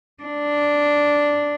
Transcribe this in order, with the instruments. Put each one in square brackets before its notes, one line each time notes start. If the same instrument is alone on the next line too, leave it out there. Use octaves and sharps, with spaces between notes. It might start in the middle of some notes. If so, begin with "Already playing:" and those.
[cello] D4